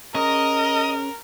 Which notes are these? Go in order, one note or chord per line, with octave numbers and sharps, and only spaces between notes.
C#4 G#4 A#4 D#5 C#6